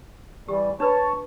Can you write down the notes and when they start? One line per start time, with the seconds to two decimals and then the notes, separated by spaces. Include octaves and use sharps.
0.48 E3 G3 G4
0.80 D4 B4 C#5 A5 B5